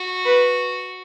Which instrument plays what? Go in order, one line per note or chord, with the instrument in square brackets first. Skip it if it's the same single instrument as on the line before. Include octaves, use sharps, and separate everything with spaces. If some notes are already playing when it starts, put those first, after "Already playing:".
Already playing: [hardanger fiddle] F#4
[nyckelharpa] B4